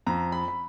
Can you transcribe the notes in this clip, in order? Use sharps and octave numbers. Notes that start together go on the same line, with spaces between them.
F2 A#5
B5
B5